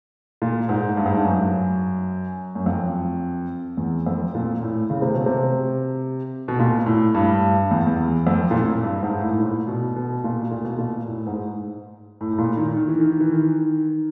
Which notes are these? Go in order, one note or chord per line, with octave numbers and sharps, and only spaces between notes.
A#2
G#2
G2
G#2
G2
F#2
F#2
F2
E2
F2
A#2
A2
C#3
C3
B2
C3
B2
A#2
A2
G2
E2
E2
F2
A#2
A2
G2
G#2
A2
A2
A#2
B2
B2
A#2
A#2
B2
A#2
A2
G#2
A2
A2
A#2
D#3
D#3
E3
D#3
E3
D#3